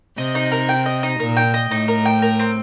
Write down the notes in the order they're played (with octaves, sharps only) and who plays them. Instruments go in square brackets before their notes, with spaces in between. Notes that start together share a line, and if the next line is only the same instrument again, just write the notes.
[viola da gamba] C3 [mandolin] D#5
[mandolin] D#4
A#4
G5
D#5
D#4
[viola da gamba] A#2 [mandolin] A#4
[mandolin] G5
D#5
[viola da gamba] A2 [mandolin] D#4
[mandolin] A#4
G5
A#4
C4